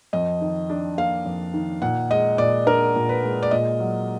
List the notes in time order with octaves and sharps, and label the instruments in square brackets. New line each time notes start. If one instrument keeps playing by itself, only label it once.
[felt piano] F2 D#5
D#3
D4
A#3 F5
F2
D#3
A#2 F#5
G#3 D#5
A#2 D5
D4 A#4
A#2
B4
G#3
D5
A#2 D#5
F#3